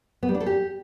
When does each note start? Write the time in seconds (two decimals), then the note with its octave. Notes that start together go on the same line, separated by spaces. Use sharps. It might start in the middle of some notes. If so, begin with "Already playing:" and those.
0.23 B3
0.29 G3
0.34 D4
0.40 A4
0.46 G4